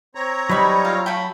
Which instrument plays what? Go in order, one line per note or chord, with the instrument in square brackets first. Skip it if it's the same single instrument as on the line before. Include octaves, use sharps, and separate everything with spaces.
[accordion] C4 C#5 A#5
[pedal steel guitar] F#3 C#6 [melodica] G3 D#4 [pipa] B4 B5
[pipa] F4
[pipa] C#3 A3 G5 [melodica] B5